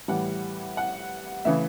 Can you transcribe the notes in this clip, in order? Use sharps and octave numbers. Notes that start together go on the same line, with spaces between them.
A2 E3 G3 F#5
F#5
C#3 E3 A3 E5